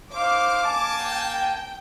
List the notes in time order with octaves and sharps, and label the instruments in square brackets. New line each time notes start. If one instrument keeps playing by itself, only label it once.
[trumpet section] D#4 C5 F5 [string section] D6
[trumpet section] A#3 G#5 A5
[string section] G5